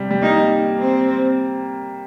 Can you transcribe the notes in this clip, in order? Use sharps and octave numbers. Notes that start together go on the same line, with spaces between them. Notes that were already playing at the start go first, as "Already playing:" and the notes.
Already playing: C3 G3
G3
A#3 D#4
C4